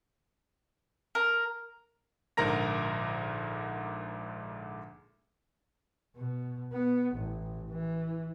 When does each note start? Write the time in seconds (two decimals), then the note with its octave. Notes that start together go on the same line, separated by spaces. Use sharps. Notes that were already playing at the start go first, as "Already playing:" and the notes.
1.15 A#4
2.37 A#1 G#2 D3 A#4 A#5 A#6
6.16 B2
6.73 B3
7.15 A1
7.70 E3